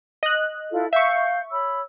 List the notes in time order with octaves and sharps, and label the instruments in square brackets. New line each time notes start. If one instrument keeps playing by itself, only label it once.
[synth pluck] D#5 F#6
[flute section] E4 F4 A4
[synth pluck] E5 C#6 [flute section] F5 G6
[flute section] C#5 B5 E6